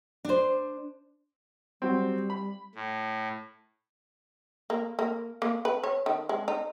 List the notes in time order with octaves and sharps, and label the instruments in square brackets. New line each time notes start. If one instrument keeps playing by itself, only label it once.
[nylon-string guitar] D4 C5
[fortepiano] F#3 C4 [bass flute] G3
[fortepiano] B5
[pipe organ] A2
[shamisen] A#3
A#3
A#3
B4
C#5
D#3
G#3
D#4